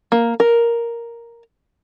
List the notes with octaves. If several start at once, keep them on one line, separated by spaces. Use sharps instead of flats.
A#3
A#4